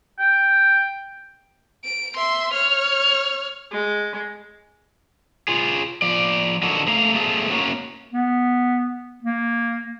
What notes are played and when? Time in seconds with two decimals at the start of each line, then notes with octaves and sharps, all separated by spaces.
0.19 G5
1.84 D7
2.17 E5 C6
2.54 C#5 F6
3.71 G#3
5.48 F4 G#4
6.02 F3 D5
6.63 D3 F#3 A#3 D#4 F#4 A4
6.87 A3 A4 F5 A#5
7.14 A3 A#3 C4 G#4 A4
7.51 A#3 C#4 F#4
8.13 B3
9.23 A#3